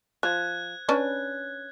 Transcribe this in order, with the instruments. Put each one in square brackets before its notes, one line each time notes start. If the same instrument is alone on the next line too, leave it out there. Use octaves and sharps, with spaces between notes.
[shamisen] F3 [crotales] F#6 G#6
[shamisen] C#4 D4 B4